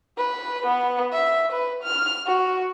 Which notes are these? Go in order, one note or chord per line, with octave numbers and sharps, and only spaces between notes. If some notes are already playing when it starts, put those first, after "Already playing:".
B4
B3
E5
B4
F6
F#4